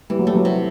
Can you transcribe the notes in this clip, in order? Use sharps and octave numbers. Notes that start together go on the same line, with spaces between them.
E3 G3
F#3
G3 A3
F#3
C3